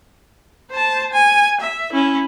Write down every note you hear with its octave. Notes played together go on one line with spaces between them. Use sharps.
C5 A5
G#5
E5
C#4 E4